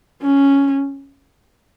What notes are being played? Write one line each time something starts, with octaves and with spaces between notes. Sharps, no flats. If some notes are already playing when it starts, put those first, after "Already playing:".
C#4